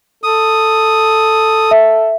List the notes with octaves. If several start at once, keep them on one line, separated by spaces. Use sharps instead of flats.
A4 D#6
E5